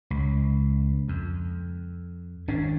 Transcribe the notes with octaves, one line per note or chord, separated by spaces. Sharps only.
C#2
F2
G#1 C#4 D4